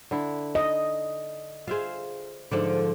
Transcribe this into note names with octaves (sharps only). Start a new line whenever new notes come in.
D3 E4
D#5
F4 G#4 C5 E5 F5
G#2 D3 F3 A4 D5